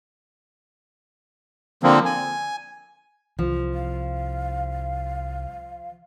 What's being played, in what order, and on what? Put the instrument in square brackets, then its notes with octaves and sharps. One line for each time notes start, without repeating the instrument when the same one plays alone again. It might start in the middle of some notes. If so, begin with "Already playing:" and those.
[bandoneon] D3 F3 A#3 C4
G#5
[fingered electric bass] C2 [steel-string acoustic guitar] F3
[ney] F5